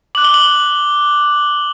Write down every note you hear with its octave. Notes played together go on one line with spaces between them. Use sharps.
D6 F#6 F#7
G7
F#7